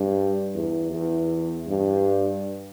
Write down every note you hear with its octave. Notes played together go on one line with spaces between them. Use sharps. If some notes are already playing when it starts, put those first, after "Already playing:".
Already playing: G2
E2
E2
G2